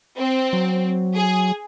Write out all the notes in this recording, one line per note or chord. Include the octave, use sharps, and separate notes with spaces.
C4
F#3
G#4